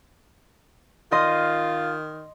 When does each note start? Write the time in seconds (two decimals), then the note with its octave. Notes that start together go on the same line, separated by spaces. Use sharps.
1.12 D#3 F4 D#5 C6